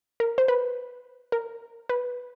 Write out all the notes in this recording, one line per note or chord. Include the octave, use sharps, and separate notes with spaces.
A#4
C5
B4
A#4
B4